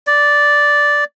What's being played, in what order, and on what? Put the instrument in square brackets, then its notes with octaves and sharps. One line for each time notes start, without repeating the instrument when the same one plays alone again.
[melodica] D5